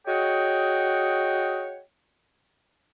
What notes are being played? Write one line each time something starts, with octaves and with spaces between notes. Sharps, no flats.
F#4 G#4 C#5 D#5 F#5 G5